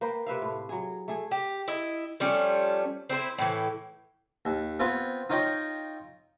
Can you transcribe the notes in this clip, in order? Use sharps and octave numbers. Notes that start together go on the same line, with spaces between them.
A#3 B4 C5 G5
C3 B4 E5 F5
A2
F#3 G#4
A3 G#4
G4
E4 D#5
F3 G3 A3 C#4
C4 E4 G#4 C5
A2 E3
D#2
B3 C4 F4
D#4 F4 C#5 D#5 G5